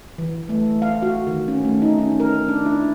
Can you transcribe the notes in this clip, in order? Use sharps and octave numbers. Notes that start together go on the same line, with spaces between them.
E3
A3
F5
F#4
D#3
C#4
A3
D#4
C#4
A#4
D4
E4